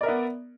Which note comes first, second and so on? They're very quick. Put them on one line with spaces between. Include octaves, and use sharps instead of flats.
D5 A#4 E5 B3